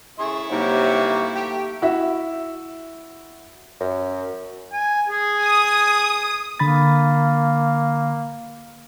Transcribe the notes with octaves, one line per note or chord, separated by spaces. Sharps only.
C#3 E4 G#4 C#6
G2 C3 F#3 A#3 D#4
A3 G4
E4 F#4 E5
F#2
G#5
G#4
D#6
D3 A#3 B5 A6